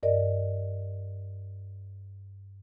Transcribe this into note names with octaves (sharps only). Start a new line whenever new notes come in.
G2 A#4 D5 D#5